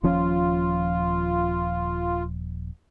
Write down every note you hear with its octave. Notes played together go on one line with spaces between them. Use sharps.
D#1 F3 C#4 F4